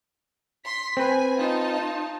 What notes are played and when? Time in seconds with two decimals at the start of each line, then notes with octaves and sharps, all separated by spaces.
0.65 C6 B6
0.97 C4 B4 G#5
1.38 D#4 F4 A5